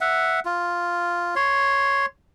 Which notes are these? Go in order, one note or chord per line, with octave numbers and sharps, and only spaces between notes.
E5 F#5
F4
C#5 C6